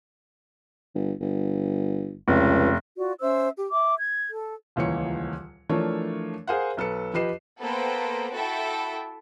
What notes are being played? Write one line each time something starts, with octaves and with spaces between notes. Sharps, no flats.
G1
G1
F1 C#2
F4 F#4 D5
C#4 C5 E5 E6
G4
E5 D6
G#6
A4
D#1 C#2 A#2 E3 C#5 C#7
E3 F3 A3 D4 A#4 C#5
G#4 A#4 C5 F5 F#5
B1 A4 B4 C#7
F3 G4 B4 D#5 C7 E7
A#3 B3 A4 B4 C5 G5
E4 F#4 A4 E5 G5 A5